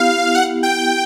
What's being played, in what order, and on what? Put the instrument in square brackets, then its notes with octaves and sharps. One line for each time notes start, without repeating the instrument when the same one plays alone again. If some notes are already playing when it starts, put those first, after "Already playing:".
Already playing: [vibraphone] B3 E4 G4 [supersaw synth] F5
[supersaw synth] F#5
G5